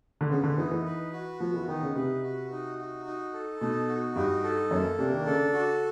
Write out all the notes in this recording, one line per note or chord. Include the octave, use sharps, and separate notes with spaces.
D3
C#3 B3
D3
E3 D#4
E3
B4
F#4
F3 B3
E3
D#3 D#4
C#3
C3 B4
F#4
D#4
F#4
D#4
A4
B2 D#4
F#4
G2 D#4
A4
F#2 A#3
C3 D4
D#3
C#3 A4
F#4